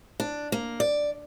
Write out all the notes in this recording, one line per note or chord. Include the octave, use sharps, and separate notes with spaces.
D4
A#3
D5